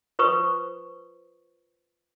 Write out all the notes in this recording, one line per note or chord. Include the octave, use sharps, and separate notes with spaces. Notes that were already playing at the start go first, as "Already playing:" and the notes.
F4 B4 C5 C#6 D#6